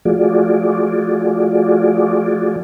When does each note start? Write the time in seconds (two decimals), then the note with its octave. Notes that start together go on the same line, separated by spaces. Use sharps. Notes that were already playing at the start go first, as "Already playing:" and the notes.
0.05 F3 A3 F4 F#4 G#4 D5